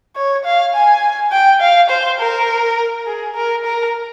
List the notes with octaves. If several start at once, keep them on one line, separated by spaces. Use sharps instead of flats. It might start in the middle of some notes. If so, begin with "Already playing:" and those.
C#5
F5
G#5
G5
F5
C5
A#4
G#4
A#4
A#4